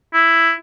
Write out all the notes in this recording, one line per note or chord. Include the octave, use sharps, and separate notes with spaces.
E4